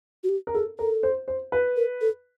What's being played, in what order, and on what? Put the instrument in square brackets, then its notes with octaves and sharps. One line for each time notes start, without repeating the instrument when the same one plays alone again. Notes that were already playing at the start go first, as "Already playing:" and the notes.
[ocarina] F#4
G4
[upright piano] A#4
[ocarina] G#4 [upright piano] A4
[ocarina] A4 [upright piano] A#4
[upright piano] C5
C5
B4
[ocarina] A#4
A4